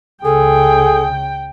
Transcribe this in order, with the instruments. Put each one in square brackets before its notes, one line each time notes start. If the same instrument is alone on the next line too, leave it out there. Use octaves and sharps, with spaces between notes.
[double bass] C#2 C#3 [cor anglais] G#4 [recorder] A4 [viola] G5